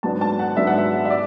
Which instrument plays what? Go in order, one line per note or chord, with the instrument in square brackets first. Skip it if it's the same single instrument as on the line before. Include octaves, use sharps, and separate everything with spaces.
[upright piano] G#2 F#3 B3 D4 A5
A5
F#5
G#2 F#3 B3 D4 E5
F#5
E5
E5
D5